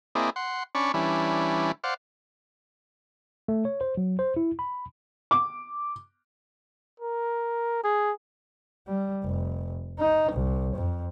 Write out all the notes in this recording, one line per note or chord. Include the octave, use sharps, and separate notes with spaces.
A#3 C4 E4 G#4 D5 D#5
F#5 C6
C#4 D4 D5 B5 C#6
E3 G3 C#4 D4 E4
C5 D5 F5 F#5
A3
C#5
C5
F#3
C5
E4
B5
D6
A#4
G#4
G3
F1
D#4
C2
F2